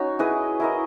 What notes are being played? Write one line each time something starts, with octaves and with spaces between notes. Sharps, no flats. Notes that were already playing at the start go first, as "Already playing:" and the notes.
Already playing: C#4 D#4 F#4 C#5
E4 G#4 B4 D#5
E4 A#4 D#5